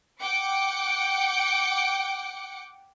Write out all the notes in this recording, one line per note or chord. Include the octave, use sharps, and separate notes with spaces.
F#5 G5 D6 C#7